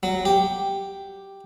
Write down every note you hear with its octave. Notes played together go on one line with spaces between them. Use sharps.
F#3
G4